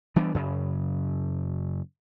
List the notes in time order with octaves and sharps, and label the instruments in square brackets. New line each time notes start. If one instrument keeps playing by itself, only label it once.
[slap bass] E3 G3 B3 D4
F#2 C#3